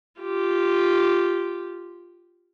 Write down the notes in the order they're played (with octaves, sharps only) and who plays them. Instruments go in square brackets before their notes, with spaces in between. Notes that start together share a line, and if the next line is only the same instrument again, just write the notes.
[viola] F4 G4